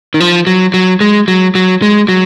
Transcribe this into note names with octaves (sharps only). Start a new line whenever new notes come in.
D#3
F3
F#3
F#3
G#3
F#3
F#3
G#3
F#3